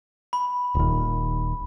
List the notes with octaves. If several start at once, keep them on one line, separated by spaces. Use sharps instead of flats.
B5
D#1 D#2